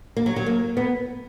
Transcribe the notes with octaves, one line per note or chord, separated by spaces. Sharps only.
A#3
F#3
F#3
A#3
B3